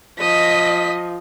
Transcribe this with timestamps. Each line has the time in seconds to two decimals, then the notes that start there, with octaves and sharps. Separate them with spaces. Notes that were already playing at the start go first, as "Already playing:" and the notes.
0.20 F3 D#5 B6